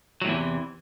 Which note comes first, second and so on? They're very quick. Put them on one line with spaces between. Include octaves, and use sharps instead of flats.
F#3 A2 E2 E3 C3